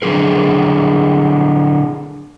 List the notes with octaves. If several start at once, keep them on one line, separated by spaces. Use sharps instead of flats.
D3 F#3 G#4 A#4